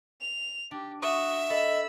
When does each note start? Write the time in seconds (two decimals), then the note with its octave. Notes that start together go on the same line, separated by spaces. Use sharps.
0.20 F7
0.71 D4 G4
1.02 F#4 E5 C#6 D#6 F#6
1.50 A4 D#5 B5 E6